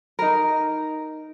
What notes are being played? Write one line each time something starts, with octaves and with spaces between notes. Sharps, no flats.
D#4 A#4